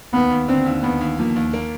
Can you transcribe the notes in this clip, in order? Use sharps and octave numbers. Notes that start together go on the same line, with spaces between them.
D#2 B3
D#2
D3 C4
D#2
D#2 B3
D#2
F3 A#3
D#2
A#3